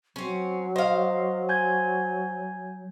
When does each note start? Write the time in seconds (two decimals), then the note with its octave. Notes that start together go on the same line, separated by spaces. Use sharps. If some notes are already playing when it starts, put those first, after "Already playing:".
0.16 F#3 C4 C#4
0.76 C5 D#5 F5
1.49 G#5 G6 G#6